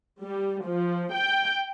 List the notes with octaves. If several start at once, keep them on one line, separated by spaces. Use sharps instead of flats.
G3
F3
G5